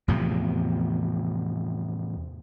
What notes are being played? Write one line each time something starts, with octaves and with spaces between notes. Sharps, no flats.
E2 A2 C3 F3